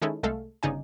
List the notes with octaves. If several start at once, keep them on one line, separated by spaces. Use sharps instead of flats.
D#3 G#3 C#4 D#4 E4 A4
C2 G#3 A3 A4 F5
G1 C#3 D#4 D5 G#5